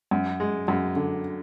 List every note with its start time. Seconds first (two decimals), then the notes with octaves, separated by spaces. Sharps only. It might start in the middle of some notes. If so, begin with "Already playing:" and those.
0.11 F#2
0.40 G#3
0.68 F#2
0.96 D3